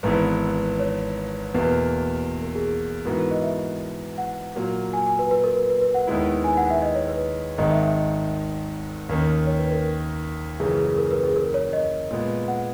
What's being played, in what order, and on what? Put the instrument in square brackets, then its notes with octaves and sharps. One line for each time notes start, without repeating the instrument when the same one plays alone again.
[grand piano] G#1 G#2 E3 B3 E4 [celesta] B4
[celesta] C#5
[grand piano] E2 B2 A#3 [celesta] B4
[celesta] A#4
G#4
[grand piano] G#2 E3 B3 F#4 [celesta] A#4
[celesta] D#5
E5
F#5
[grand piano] A#2 F#3 A#3
[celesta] G#5
G#5
B4
B4
A#4
B4
B4
B4
F#5
[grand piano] D#2 D#3 G#3 B3 E4
[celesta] G#5
F#5
E5
D#5
C#5
B4
[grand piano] G#1 G#2 D#3 [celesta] D#5
[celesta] E5
E5
D#5
[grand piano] D#2 D#3 A#3 C#4
[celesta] C#5
B4
A#4
[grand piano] F#2 C#3 E3 A#3 C#4 [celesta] G#4
[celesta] G#4
G#4
A#4
B4
G#4
A#4
C#5
D#5
[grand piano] A#2 G#3 B3
[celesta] F#5